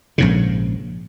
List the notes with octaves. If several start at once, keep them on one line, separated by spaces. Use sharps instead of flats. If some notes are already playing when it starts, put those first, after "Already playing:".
A#1 G#2 C#3